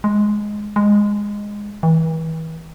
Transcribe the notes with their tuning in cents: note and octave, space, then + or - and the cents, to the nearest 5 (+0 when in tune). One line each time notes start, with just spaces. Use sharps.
G#3 +5
G#3 -10
E3 -35